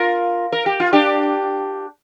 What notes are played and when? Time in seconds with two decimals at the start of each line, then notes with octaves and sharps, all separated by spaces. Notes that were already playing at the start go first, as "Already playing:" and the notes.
Already playing: F4 A#4
0.52 A#4
0.66 G4
0.80 F4
0.93 D4 G4